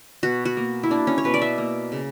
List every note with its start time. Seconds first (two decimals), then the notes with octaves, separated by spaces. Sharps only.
0.23 B2 F#4
0.45 F#4
0.57 A#3
0.83 E4
0.91 A#3 D4
1.07 C#4
1.18 C#5
1.24 B2 B4
1.34 D5
1.42 E5
1.58 A#3
1.92 C#3